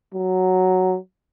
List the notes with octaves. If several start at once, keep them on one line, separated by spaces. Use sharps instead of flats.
F#3